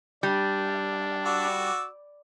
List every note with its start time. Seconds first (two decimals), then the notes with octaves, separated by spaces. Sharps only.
0.23 G3 D4
1.25 F#4 D5 E6